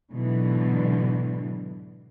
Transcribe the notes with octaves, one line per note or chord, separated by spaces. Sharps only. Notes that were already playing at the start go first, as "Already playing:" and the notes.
G#2 B2 D3 E3 F#3